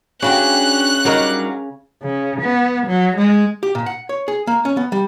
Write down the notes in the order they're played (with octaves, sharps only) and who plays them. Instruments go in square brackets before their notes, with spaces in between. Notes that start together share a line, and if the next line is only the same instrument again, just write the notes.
[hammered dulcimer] C#3 [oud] D4 F#4 G4 [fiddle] F#6
[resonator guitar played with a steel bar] F#3 A#4 [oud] G3 D4 D#4
[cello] C#3
B3
F#3
G#3
[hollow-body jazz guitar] G4
A#2
F#5
C#5
G#4
A#3
C#4
B3
G3